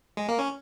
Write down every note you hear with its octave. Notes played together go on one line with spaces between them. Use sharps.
G#3
A#3
C#4